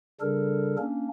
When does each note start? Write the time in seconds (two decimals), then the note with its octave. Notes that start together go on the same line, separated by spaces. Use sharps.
0.21 C#3 G3 D4 A4 A#4
0.78 A#3 C#4 D4